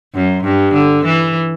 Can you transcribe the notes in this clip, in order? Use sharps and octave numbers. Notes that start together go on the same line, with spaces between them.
F#2
G2
D3
E3